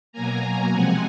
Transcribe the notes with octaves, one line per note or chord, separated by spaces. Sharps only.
B2 F#3 A#3 G#5 A#5
C3 F3 G#3 C4 F#5 G#5